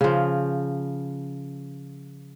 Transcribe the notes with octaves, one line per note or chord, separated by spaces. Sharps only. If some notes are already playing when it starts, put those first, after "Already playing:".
C#3 F3